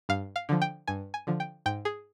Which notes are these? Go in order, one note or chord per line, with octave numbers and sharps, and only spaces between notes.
G2 F5
F5
D3 F3
G5
G2 G#5
G#5
D3 F3
G5
G#2 G5
G#4